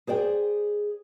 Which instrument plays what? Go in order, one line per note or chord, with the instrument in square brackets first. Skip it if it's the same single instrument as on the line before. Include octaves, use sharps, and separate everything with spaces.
[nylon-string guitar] G#4 C5 D5 G5